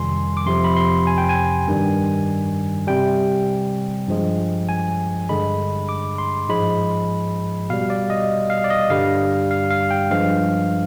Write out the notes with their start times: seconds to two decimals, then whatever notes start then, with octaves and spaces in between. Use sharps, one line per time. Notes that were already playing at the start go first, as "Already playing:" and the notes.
Already playing: F2 C3 D#3 G3 G#5 C6
0.37 D6
0.46 F2 C3 F3 C6
0.64 B5
0.77 C6
1.07 G#5
1.18 G5
1.29 G#5
1.68 G2 D#3 G3
2.87 C3 G3 G5
4.08 G2 F3 G#3
4.69 G#5
5.29 G2 D3 G#3 B5
5.89 D6
6.18 C6
6.49 G#2 F3 G#3 B5
7.70 B2 G3 F5
7.90 D5
8.10 D#5
8.50 F5
8.64 D5
8.70 D#5
8.90 G2 D3 G3 F5
9.51 F5
9.71 F5
9.91 G5
10.11 G2 F3 G#3 F5